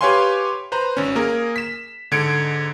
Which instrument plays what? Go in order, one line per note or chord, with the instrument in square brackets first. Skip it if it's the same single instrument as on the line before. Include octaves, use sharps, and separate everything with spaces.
[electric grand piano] G4 B4 C#5 F5 G#5 C6
B4 C5 A#5
G#1 C#4
A#3 G#4 A#4
B6 E7
G#2 D3 G#6 C#7 D7